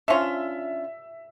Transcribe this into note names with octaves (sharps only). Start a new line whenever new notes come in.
D3 F3 C#4 F4 E5